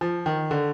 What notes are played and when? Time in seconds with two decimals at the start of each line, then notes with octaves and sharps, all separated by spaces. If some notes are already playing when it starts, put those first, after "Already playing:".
0.01 F3
0.26 D#3
0.51 D3